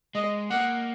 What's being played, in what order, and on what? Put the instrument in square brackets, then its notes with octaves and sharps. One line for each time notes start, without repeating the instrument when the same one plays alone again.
[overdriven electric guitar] G#3 [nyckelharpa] D#5
[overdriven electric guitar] A#3 [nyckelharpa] F#5